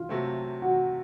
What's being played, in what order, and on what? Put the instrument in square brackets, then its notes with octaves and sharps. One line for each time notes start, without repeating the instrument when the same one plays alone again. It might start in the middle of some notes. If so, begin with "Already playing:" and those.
Already playing: [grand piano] F4
[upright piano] C3 F#3 A3 C4
[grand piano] F#4